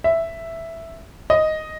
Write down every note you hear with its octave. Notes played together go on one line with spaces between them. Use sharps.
E5
D#5